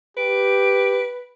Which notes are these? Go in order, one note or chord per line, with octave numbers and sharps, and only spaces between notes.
G4 B4 D7